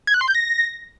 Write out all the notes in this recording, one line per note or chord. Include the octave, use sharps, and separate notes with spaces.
G#6
F#6
C6
G6
A#6